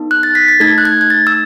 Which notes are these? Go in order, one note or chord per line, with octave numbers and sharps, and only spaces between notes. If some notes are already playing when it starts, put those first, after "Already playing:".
Already playing: B3 D#4 A4
F#6
A6
B6
A6
A3 D#4 A4 G#6
F#6
G#6
G#6
A6
E6